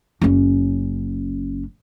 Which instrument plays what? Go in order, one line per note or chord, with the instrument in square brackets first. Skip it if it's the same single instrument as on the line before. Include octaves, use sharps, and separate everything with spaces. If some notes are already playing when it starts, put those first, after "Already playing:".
[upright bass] F#1 C#4